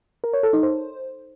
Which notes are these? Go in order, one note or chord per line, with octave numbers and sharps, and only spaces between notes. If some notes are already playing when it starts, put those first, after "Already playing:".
A#4
C#5
A4
D#4
C5